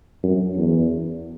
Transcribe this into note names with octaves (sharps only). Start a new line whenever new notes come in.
F#2
E2